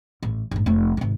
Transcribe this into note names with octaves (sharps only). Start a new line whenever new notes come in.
A1
G1 A2
F1 A3
G#1 C3